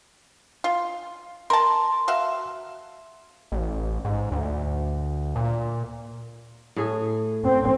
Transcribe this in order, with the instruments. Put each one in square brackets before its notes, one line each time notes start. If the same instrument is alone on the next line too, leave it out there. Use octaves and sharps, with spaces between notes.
[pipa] F4
[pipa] A#4 A5 [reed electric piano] C6
[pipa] F#4 E5 F5
[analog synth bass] A1
G#2
D2
A#2
[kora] A2 G#4
[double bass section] C4